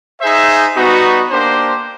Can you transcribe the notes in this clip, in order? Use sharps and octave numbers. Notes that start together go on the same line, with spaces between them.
D#4 G#4 C5 E5
G3 B3 D#4 F#4
A#3 D4 G4 C5